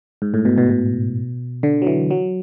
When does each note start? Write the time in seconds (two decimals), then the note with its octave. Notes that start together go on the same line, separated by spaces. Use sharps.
0.22 G#2
0.34 A2
0.45 B2
0.58 B2
0.70 B2
1.63 D3
1.82 F#3
1.87 E3
2.11 F#3